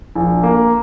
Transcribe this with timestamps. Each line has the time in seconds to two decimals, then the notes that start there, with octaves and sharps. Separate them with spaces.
0.16 A#1
0.43 A#3